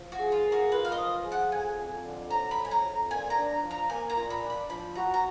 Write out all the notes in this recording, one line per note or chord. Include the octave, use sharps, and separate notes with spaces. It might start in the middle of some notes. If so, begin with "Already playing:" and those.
Already playing: F3
F#4
G#4
F4
A#3
F#4
F4 B4
F5
D#5
F3
G#4
F#5
F2 G#5
F2
D3
F#3 A#5
B5
F2
G#5
A#5
F2
A#2 G#5
A#5
D4
F3
A#5
A#3 G#5
A#5
A#2
B5
D4
B5
F3 B5
F#4 A#5
A#5